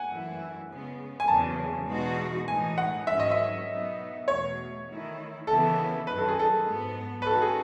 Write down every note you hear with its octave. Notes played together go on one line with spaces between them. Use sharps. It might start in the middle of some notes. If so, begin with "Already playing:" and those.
Already playing: F#5 G#5
F#2 E3 A3 E4
C#3 G#3 B3
G#5
E2 C#3 F#3 A5
E2 B2 G#3 D#4 F#4
A2 E3 G#3 D#4 G#5
F#5
G#2 D#3 F#3 C#4 E5
D#5
E5
B2 F#3 B3 D#4
E2 B2 A3 C#5
D#3 A3 E4
D#2 C#3 E3 B3 E4 A4
F#2 D#3 F#3 B4
A4
G#4
A4
G#2 F#3 B3
B4
D#3 G#3 C#4 F#4 A4
G#4